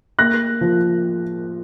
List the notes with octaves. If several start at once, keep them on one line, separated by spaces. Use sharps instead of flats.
A#3 F#6 A#6
F3